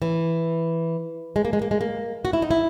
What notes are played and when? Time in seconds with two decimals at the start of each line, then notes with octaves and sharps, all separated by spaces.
0.02 E3
1.36 G#3
1.45 A#3
1.53 G#3
1.62 A#3
1.71 G#3
1.81 A#3
2.25 F#4
2.33 E4
2.42 D#4
2.51 E4